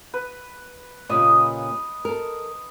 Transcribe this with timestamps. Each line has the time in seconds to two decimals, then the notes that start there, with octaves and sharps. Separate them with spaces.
0.14 B4
1.09 A#2 C#3 G3 D#5 B5 D#6
2.05 A4 A#4